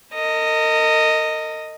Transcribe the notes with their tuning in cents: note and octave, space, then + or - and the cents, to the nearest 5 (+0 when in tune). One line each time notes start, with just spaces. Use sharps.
A#4 -40 D#5 +0